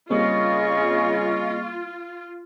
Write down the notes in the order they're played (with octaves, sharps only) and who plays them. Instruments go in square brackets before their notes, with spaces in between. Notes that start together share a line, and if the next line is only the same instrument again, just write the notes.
[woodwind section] C#3 G#4 C#6 [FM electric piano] G3 A#3 C4 [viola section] F4 [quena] D#5